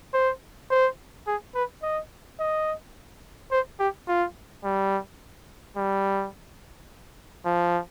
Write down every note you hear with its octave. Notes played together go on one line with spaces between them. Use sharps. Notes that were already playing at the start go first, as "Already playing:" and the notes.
C5
C5
G#4
B4
D#5
D#5
C5
G4
F4
G3
G3
F3